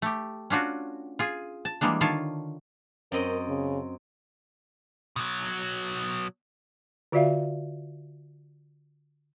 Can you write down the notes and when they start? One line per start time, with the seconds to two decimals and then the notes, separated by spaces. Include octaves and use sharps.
0.02 A3 G4
0.50 C#4 D4 F4 F#4
1.19 F4 G#4
1.65 A5
1.81 E3 G3 G#3 A#3 D4
2.01 D3 D#3 F4 C#5 A5
3.12 F#2 C4 A#4 D#5
3.48 C#3
5.16 B2 F#3
7.12 D3 F4 F#4 D5 E5 F5